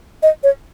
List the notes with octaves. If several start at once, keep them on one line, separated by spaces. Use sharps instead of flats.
D#5
C#5